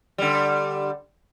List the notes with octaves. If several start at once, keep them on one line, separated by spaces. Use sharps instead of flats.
D3 G3